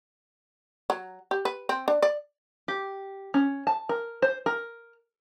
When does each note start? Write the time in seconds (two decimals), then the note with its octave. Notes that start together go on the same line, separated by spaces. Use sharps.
0.90 F#3
1.31 G4
1.45 B4
1.69 C4
1.88 D4
2.02 D5
2.68 G4
3.34 C#4
3.67 A5
3.89 A#4
4.22 C5
4.46 A#4